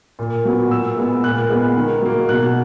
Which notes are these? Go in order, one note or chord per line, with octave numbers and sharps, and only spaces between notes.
A#2
F#3 B3
A#2 E6
G#3 B3
A#2 F#6
G#3 B3
D#3
F#3 A#3
B2 F#6